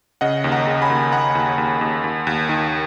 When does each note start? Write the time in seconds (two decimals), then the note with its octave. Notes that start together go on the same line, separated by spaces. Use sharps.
0.21 C#3 D#5 F#5
0.44 D#2
0.52 F#5 A#5
0.67 C#3
0.82 G#5 B5
0.90 D#2
1.12 D#2 F#5 A#5
1.35 D#2
1.58 D#2
1.81 D#2
2.04 D#2
2.27 D#2
2.49 D#3